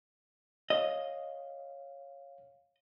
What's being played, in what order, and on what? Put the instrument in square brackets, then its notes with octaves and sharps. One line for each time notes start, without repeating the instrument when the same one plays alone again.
[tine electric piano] C#5 F5 [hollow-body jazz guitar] D#5